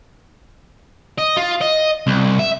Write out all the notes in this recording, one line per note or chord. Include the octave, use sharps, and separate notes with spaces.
D#5
F4
D#5
C2
E5